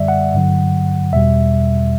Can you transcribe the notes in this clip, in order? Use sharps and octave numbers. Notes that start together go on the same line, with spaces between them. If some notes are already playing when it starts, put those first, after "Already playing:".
Already playing: F#2 D3 G3 D5 E5
F#5
G2 D3 F#3
E2 B2 G3 E5